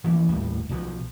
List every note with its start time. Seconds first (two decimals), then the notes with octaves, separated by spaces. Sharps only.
0.04 E3 F3 A#3 C#4
0.29 D1 D#2 A2 G3
0.69 B1 B2 F3